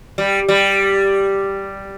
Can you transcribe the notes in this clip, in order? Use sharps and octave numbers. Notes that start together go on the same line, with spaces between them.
G3
G3